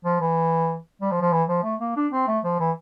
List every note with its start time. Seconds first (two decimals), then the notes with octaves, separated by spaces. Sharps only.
0.05 F3
0.21 E3
1.01 G3
1.11 F3
1.22 F3
1.32 E3
1.49 F3
1.64 A3
1.80 A#3
1.96 D4
2.12 C4
2.28 A3
2.44 F3
2.60 E3